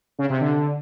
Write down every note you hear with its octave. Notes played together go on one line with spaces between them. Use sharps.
C#3
C3
D3